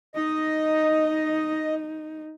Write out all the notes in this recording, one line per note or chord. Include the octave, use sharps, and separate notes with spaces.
D#4 D#5